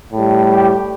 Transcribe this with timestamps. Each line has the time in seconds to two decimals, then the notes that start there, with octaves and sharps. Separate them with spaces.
0.13 A2 G3
0.53 G4